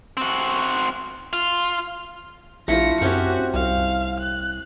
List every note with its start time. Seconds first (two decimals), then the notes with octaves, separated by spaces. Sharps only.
0.17 C4 F#4
1.33 F4
2.68 A#1 A3 E4 F4 A#6 C#7
3.01 F#2 C4 C#4 F#4 G4
3.54 C2 F5
4.20 F#6